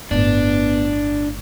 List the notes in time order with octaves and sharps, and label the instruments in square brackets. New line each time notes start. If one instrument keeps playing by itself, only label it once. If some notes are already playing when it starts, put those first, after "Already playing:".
[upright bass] G1 A2 [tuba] B3 [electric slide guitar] D4